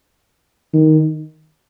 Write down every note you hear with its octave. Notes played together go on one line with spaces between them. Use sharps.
D#3